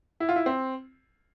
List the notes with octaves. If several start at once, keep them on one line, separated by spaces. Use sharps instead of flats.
E4
F4
E4
C4